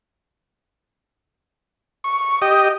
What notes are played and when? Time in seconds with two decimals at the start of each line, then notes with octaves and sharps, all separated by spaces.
2.04 C#6
2.42 G4 D#5